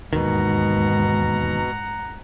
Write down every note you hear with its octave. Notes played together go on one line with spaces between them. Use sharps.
E1 D#2 G#2 B2 D#3 F#5 A#5